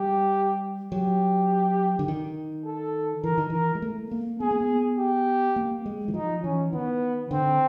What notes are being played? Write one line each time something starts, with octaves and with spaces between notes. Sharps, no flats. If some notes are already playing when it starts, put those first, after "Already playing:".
Already playing: G3 G4
F#3 G4
D3
D#3
A4
E3 A#4
D#3
E3 A#4
G#3
A3
A#3
B3 G#4
A#3
B3
G4
A#3
G#3
E3
F3 D#4
E3 C#4
D#3 B3
D3 C4